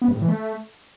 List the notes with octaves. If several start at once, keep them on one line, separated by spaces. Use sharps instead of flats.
B3
G2
A2
E3
A3